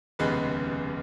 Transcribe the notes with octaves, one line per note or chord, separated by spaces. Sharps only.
F1 D#2 C#3 G#3 B3 B4